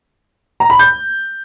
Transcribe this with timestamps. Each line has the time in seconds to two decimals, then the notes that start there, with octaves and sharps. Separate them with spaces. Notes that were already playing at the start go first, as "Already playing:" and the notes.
0.60 A#5
0.70 B5
0.79 G6